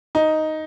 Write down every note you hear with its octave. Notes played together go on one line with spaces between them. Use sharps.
D#4